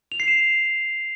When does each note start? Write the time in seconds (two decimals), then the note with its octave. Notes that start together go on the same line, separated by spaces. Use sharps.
0.12 F7
0.20 C7
0.28 E7